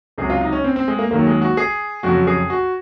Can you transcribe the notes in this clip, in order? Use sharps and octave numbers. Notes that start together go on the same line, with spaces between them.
C#2 C3 F#3 G#4
F4
D#4
C#4
C4
C4
G#3
A#3
D#2 D#3 F#3 A#3
G#3
F#4
G#4
F2 C#3 F#3 F#4
G#4
F#4